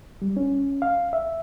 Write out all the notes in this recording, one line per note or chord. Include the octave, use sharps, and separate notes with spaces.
G3
C#4
F5
E5